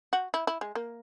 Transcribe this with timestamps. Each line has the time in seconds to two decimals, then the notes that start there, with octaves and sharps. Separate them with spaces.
0.13 F#4
0.34 E4
0.47 E4
0.61 G#3
0.75 A#3